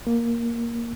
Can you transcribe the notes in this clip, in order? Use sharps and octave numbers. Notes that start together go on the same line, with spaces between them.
A#3